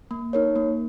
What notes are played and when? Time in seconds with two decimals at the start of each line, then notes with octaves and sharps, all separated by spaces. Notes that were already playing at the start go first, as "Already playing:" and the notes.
0.11 A#3
0.33 D#4 A#4 C#5
0.56 A#3